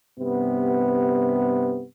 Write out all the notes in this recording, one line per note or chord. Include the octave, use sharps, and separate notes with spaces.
G2 C3 B3